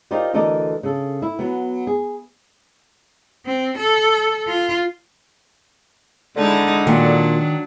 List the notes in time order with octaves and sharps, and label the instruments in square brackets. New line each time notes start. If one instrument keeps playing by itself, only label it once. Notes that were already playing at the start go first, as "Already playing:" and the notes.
[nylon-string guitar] D#4 F4 G4 A#4 C5 D5
D2 E3 A4 A#4 D5 D#5
C#3 A4
E4
F#3 B3
G#4
[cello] C4
A4
F4
[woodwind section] D3 [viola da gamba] G#3 D#4 E4
[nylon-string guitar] A#2 [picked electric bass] D#3 [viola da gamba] F#3 D4